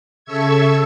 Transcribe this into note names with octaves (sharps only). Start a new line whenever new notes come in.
C#3 A4 E5 C#6 E6 G#6